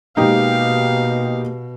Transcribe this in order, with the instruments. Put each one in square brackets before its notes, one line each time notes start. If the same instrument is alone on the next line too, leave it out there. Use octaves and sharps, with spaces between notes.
[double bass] B2 [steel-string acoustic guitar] G#3 A#3 [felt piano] D#4 G4 [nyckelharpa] F5